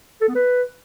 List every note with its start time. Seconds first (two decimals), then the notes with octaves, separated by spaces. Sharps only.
0.21 A4
0.28 B3
0.35 B4